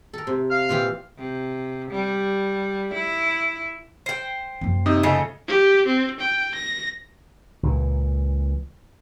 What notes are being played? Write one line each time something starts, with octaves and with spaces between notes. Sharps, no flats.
A4 A#4
C3
F5 F6
A#2 E3 G4
C3
G3
E4
C5 G5
F#2 A#3
C3 D#4 D#6
C#3 F3 A3 A4 D#5
G4
C4
G5
A#6
C#2 A#2 E3